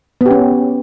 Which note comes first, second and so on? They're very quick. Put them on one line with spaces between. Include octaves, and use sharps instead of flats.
B3 G4 C#4